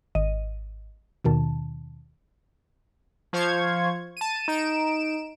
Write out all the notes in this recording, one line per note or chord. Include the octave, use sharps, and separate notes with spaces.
G#1 D#5 D#7
D#2 B2 D#3 A5
F3 C5 F5 C#6 G#6
A5 D#7
D#4 D7 E7